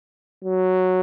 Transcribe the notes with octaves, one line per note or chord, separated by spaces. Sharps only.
F#3